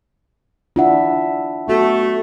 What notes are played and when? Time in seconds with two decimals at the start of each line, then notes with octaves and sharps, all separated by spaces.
0.76 D4 E4 F4 E5 F#5
1.68 A3 B3 F#4